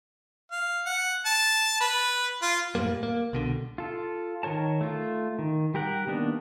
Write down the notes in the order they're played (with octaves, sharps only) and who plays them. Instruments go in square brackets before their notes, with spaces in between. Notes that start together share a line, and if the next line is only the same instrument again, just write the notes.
[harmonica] F5
F#5
A5
B4
F4
[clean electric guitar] F#2 A2 G3 A#3
A#3
C2 B2 D3
[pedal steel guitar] F4 A4
D#3 A#4 C#5 A5
A3 F4
D#3
G3 G4 A#4 F#5
D#3 A#3 B3 D4